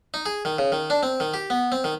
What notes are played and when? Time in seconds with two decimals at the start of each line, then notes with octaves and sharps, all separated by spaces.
0.14 D#4
0.26 G#4
0.45 D#3
0.58 C#3
0.72 D#3
0.90 D4
1.03 C4
1.20 D#3
1.34 G4
1.50 B3
1.72 C4
1.84 D#3